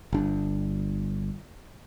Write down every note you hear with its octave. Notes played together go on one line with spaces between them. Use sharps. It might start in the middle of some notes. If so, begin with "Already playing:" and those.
G1 D4